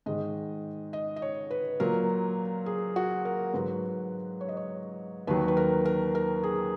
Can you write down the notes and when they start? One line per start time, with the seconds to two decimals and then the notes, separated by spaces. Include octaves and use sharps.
0.06 G#2 D#3 G#3 D#5
0.93 D#5
1.16 D#5
1.22 C#5
1.50 B4
1.80 A#2 F#3 A#4
2.66 G#4
2.96 F#4
3.25 A#4
3.54 G#2 F#3 B4
4.41 C#5
4.49 D#5
4.57 C#5
5.27 D#2 D#3 F#3 B4
5.48 B4
5.57 A#4
5.85 A#4
6.15 A#4
6.43 G#4